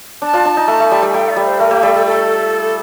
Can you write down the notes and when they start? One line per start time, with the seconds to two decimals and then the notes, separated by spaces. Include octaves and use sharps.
0.22 D4 A5
0.33 D4 F4
0.45 D4
0.57 D#4
0.68 A3
0.80 A3
0.91 G3
1.02 G3
1.09 A5
1.14 A3 G5
1.29 D5
1.36 G3
1.45 C5
1.60 A3 A#4
1.71 A3 G4
1.83 G3 A4
1.94 A4
2.06 A4